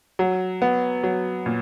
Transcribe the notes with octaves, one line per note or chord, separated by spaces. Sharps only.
F#3
B3
F#3
A#2